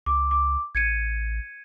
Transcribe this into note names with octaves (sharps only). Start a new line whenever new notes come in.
C#2 D6
D6
A1 G#6 C#7 D#7